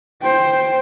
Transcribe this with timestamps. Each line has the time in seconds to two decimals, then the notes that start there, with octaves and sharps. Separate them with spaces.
0.22 C5 G5